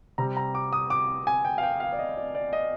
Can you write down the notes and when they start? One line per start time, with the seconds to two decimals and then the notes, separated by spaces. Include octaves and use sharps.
0.18 C3 G3 C4 A#5
0.37 A#5
0.55 D6
0.73 D#6
0.90 D6
1.27 G#5
1.45 G5
1.58 F5
1.63 G5
1.80 F5
1.92 D5
1.99 D#5
2.17 D5
2.35 D5
2.53 D#5